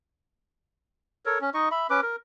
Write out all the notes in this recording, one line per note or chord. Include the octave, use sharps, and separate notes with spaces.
A4 A#4 C#5
C#4
D#4 D#5 C#6
E5 B5
C#4 B4 D6
A#4